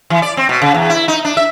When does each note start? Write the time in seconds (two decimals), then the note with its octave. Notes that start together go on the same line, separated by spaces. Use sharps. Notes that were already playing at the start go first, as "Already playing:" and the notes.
0.10 E3
0.22 D5
0.37 C4
0.49 B2
0.62 C#3
0.75 E2
0.90 E4
1.08 D#4
1.25 D4
1.37 E5